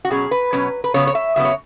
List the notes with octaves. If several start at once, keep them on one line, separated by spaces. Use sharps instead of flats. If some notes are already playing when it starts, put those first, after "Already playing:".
F#4
B2 F#3 C#4 G#4
B4
B2 F#3 C#4
B4
C#3 F#3 B3 C#5
C#5
E5
C#3 F#3 B3 E5
C#5